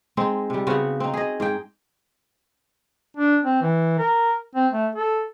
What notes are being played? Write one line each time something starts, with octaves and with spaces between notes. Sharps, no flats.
G#3 C4 D#4
C3 G3
C#3 B3 C4 F#4
C4 D#4
G#4 D#5
G#2 G#4 G5
D4
C4
E3
A#4
C4
A3
A4